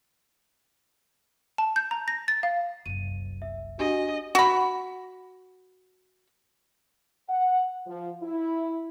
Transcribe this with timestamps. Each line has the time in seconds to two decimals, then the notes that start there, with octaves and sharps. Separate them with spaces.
1.58 A5
1.76 G6
1.91 A#5
2.08 A#6
2.28 A6
2.43 F5
2.86 F#1 C2 D#7
3.42 E5
3.79 D4 F#4 G4 D#5 G#5
4.35 F#4 B5
7.29 F#5
7.87 F3
8.23 E4